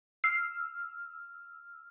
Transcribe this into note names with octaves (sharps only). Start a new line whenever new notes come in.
E6 F6 C7